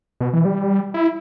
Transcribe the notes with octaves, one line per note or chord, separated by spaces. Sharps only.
B2
E3
G3
E4